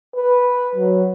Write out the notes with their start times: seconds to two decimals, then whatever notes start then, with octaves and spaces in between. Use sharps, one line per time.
0.16 B4
0.76 F#3